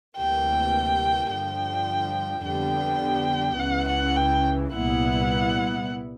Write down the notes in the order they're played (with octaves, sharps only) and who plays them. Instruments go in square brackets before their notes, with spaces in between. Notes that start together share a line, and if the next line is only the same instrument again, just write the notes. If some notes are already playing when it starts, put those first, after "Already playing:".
[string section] D2 C3 E3 G3 A#3 [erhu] G5
[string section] G2 D3 F3 [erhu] G5
[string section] F2 D3 G3 B3 [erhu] G5
[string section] C#2 C#3 E3 [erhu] F#5
[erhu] F#5
G5
[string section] C2 A#2 G3 B3 E4 [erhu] F#5